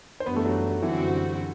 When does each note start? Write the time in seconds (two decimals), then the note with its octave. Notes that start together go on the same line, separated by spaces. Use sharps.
0.20 C5
0.26 F#2 E3 G3 B3 D4 B4
0.36 A3 A4
0.45 F#3 F#4
0.82 F#2 D3 E3 G3 C4 E4 F#4